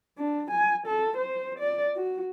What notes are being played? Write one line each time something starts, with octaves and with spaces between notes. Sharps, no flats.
D4
G#5
A4
C5
D5
F#4